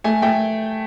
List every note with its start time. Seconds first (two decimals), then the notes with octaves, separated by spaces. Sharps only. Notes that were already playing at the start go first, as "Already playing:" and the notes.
0.04 A3 G#5
0.22 A3 G5